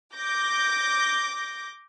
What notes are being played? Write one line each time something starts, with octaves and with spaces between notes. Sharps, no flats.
D6 G6 A#6